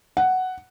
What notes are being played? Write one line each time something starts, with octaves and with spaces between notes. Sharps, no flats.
F#5